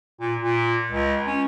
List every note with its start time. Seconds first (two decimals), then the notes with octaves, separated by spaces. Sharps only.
0.20 A#2
0.41 A#2
0.91 C#2
1.27 C#4